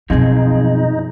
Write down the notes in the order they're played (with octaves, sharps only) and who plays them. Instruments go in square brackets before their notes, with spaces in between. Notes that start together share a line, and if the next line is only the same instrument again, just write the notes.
[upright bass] F#2 B2 [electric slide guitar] F3 C4 G#4 [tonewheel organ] D#4